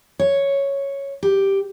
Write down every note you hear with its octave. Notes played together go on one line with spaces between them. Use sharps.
C#5
G4